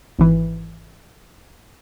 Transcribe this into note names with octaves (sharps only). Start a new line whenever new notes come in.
G#1 E3